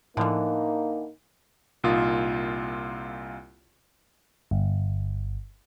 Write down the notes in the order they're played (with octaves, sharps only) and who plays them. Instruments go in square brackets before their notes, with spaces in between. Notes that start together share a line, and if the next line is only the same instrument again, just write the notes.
[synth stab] A2 F3 [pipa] D3 E3 [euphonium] A#3 [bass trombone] D#4
[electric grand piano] C2 A#2 D#4 F4 D#6
[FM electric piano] G1